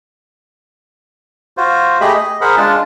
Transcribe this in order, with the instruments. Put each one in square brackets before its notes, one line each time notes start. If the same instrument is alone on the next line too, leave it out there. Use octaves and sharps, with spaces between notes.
[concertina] F4 F#4 C5
A3 G4 G#4 D#5 B5
D#5
G#4 A#4 C5 F#5 B5
G#3 D4 F4 A5